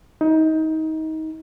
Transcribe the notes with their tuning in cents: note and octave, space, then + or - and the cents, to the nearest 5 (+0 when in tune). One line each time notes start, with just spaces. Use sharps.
D#4 +25